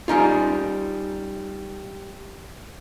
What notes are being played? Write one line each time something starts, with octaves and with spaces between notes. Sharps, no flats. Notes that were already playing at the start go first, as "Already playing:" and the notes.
G3 C#4 D#4 F4